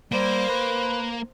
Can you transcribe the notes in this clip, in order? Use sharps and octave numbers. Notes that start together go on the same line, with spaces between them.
G3 A#3 C5
B4